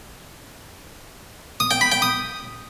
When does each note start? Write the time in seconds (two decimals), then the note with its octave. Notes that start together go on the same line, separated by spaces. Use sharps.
1.60 D#6
1.71 G5
1.81 B5
1.92 G5
2.02 D#6